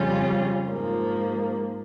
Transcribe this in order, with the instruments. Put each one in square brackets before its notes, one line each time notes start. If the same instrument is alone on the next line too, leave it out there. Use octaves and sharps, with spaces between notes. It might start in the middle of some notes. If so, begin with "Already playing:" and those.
Already playing: [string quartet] F2 C#3 G3 C#4 F4
G#2 F3 A#3